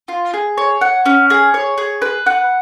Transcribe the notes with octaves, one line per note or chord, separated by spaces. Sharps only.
F4
G#4
C#5
F#5
C#4
G#4
C#5
G#4
B4
F#5